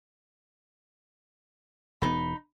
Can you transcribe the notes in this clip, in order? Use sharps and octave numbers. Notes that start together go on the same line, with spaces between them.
E1 E2 B3 D#4 B5